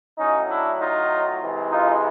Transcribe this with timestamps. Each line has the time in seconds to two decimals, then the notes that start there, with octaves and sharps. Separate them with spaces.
0.17 A2 F#3 C#4 D#4
0.48 D4 E4
0.79 D#4 F4
1.41 C3 E3 G#3
1.71 D#4 F4